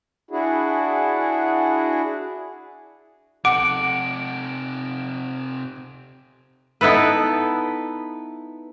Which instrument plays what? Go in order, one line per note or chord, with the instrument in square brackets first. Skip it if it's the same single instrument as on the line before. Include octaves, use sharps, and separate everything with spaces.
[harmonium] D4 E4 F#4 G#4
[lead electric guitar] C3 A4 [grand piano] F#5 [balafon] D6 [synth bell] D7
[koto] B3 D#4 E4 A4 B4